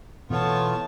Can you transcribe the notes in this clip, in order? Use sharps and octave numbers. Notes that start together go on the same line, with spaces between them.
B2 E3 A3 B3 F4 C#5 A5